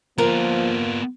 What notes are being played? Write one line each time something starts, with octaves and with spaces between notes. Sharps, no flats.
F3 A#3 B3 F4 A#4